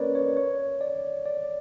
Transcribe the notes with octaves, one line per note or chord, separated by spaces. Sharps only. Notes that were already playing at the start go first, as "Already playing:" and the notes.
Already playing: A#3 C#4 A#4 B4 C#5 D5
C#5
C#5
D5
D5